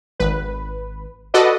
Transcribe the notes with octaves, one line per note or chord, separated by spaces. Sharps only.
G#1 B4
F#4 A4 B4 D5 D#5